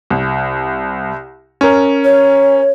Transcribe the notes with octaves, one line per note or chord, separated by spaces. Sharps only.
C2
C#4 A#4
C#5